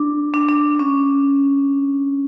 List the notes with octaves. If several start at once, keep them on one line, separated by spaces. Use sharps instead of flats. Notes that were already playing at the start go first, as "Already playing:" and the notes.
Already playing: D4
D4
D4
C#4